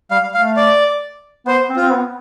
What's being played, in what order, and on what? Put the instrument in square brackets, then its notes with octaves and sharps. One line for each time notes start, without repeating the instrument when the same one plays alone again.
[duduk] G3 [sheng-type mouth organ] F5
[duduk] A3 [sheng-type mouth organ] F5
[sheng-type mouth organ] D5
[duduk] B3 [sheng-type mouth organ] C5
[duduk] C4
[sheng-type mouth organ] F4
[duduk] C4
B3